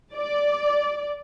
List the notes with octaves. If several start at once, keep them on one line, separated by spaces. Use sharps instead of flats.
D5